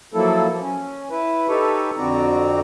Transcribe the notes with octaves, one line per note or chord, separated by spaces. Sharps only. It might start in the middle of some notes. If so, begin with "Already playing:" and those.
F3 F#3 A#3 E4 A4
F3
C#4
E4 B4
D#4 G4 A4 B4 C#5
F2 D3 C4 F#4 D5 A#5